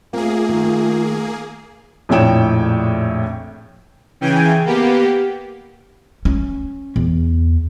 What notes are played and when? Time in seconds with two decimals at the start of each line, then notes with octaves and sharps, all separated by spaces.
0.13 A3 A#3 C4 F4 G#4
0.49 D#3
2.09 A#1 F2 A2 C#5 G5 E7
4.21 C#3 E3 G5 G#5
4.65 A#3 B3 G4
6.25 C#4
6.96 E2